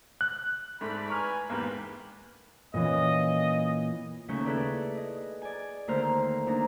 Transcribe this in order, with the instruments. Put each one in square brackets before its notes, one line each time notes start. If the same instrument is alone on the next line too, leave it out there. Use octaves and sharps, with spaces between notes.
[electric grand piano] F#6
[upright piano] G#2 A3 [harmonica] D5 B5
[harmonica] B4 G#5 A#5 [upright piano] C#6 D6 F6
[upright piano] E2 G#2 A#3 [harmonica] G4 B4
[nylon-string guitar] A#2 E3 C#4 [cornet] D#5
[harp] D#2 C#3 A3 C#4 C#6 G6
E4 G#4 A4 B4 D5
D#5
D5 G#5
D#2 D3 A3 A#4 C5 F6
D#2 D4 A#5